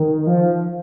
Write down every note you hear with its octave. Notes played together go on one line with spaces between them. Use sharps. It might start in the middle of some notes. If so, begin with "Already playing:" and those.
Already playing: D#3
F3